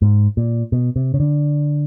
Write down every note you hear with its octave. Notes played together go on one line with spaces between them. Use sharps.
G#2
A#2
B2
C3
C#3
D3